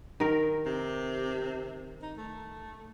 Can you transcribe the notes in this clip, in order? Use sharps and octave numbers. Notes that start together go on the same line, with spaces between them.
D#3 A#4
C3
D#4
A3